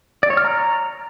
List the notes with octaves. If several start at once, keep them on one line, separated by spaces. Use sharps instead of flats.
D5
C#5
F6
A#5